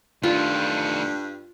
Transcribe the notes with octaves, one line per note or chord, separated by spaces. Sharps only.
G2 D#3 A3 D4 F4